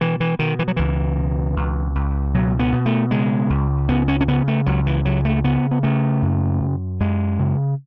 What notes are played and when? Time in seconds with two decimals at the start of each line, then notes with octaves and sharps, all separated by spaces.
0.01 B2 E3
0.20 E3
0.39 B2 D#3
0.59 E3
0.68 F#3
0.76 C#2 E3
1.17 B2
1.56 C#2
1.95 C#2
2.34 B2 F#3
2.59 B3
2.72 B2
2.86 A3
3.11 C#3 G#3
3.50 C#2
3.89 C#3 B3
4.08 C#4
4.21 C#4
4.28 C#3 B3
4.48 A3
4.66 C#2 F#3
4.87 E3
5.05 C#3 F#3
5.25 A3
5.44 C#3 B3
5.71 B3
5.83 C#3 A3
6.22 F#2
6.61 F#2
7.00 F#2 G#3
7.39 C#3